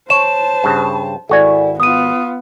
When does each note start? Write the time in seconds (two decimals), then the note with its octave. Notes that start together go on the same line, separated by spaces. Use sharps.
0.10 C5 C#5 A5 E7
0.64 G2 C#3
1.29 G#1 E4 F#4 A4 D5 G#5
1.80 B3 F4 D#6 D#7